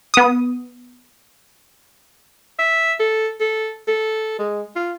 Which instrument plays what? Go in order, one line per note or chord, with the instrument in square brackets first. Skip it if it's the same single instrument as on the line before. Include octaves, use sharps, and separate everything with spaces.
[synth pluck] B3 D#6
[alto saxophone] E5
A4
A4
A4
G#3
F4